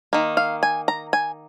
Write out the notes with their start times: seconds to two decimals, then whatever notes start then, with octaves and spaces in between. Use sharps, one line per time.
0.13 D#3 A#3
0.37 F5
0.63 G#5
0.88 A#5
1.13 G#5